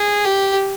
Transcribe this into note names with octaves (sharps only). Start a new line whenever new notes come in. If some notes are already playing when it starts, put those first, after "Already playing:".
Already playing: G#4
G4